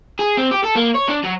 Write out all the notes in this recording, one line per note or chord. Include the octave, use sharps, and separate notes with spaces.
G#4
C4
G4
A4
A#3
C#5
D4
F#3